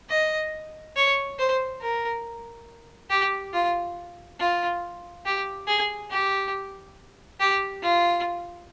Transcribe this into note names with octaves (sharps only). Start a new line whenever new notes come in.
D#5
C#5
C5
A#4
G4
F4
F4
G4
G#4
G4
G4
F4